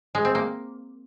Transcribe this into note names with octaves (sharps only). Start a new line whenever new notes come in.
G#3
C4
A#3